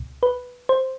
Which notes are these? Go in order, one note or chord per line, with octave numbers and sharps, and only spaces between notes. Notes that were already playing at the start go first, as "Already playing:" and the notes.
Already playing: C#2 B2
B4
C5